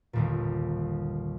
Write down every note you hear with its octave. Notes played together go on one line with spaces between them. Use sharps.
G1 D#2 A#2